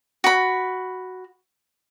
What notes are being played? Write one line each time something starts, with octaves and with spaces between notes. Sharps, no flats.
F#4 B5